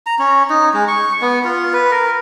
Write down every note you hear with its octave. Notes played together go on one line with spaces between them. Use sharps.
A#5
C#4
D#4
G#3
C#6
B3
F4
B4
A#4